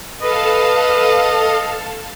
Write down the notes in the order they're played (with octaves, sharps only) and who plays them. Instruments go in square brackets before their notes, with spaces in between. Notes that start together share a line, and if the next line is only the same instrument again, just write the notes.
[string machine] A4 F5 A5 [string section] B4 [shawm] D#5